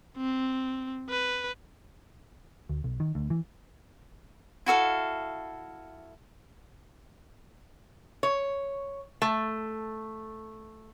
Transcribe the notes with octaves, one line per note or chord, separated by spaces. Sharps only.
C4
B4
D2
B1
D#3
D2
E3
E4 F#4 A4 F5
C#5
A3